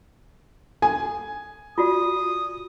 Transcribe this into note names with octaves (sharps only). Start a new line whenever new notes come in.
A4 G#5
F4 F#4 D5 D#6